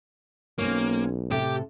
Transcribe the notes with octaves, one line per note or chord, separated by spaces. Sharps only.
B1 A#3 C4 C#4 C#5
A2 C3 G4 A4